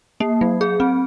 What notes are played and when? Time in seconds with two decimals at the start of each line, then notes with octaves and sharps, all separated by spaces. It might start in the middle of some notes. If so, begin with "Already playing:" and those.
0.20 A#3
0.41 F#3
0.61 G#4
0.80 C4